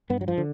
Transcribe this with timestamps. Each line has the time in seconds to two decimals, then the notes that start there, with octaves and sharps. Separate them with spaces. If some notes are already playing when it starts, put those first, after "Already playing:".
0.10 G2 B3
0.21 F#3
0.28 F3
0.38 D3